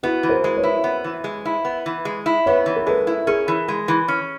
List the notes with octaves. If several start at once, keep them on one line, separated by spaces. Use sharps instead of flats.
B3 E4 F#4
E3
A#4 C5
G#3
B4 C#5
E4
B3
E3
G#3
E4
B3
E3
G#3
E4
B3 B4 C#5
E3
A#4
G#3 A4 B4
E4
C#4 G#4 A#4
E3
G#3
E3
C#4